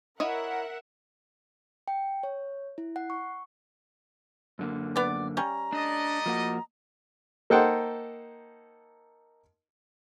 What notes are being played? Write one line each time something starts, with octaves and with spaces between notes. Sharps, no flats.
E4 A#4 C#5 D#5 E5 F#5
G5
C#5
E4
F#5
C#6
F#2 D3 A#3
B3 D5
G3 C#4 A#5
A3 D4 D5 D#5
F3 A#3 F#4
A#3 D#4 A4 C5 F#5 G5